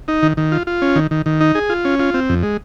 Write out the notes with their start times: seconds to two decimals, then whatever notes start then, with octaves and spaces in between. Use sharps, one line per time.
0.08 D#4
0.23 D#3
0.37 D#3
0.52 F4
0.67 F4
0.82 C#4
0.96 D#3
1.11 D#3
1.26 D#3
1.41 D#4
1.55 G#4
1.70 F4
1.85 C#4
2.00 F4
2.14 C4
2.29 F2
2.43 G#3